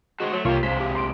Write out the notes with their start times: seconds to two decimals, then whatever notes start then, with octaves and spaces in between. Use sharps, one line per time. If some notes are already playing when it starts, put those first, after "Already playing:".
0.20 G#3 F#4 G4 C5
0.33 F#3 A3
0.45 C2 A#3 F4 G4 C#5
0.63 C3 G#3 C5 F5 B6
0.80 G4
0.95 C6 D7